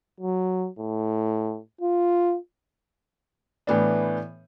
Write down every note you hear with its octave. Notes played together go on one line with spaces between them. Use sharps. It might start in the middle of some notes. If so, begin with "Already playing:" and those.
F#3
A2
F4
A2 E3 B3 D4